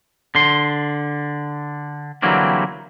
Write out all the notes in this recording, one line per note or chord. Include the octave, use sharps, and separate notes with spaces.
D3 C6
D3 E3 F#3 G3 A#3 C4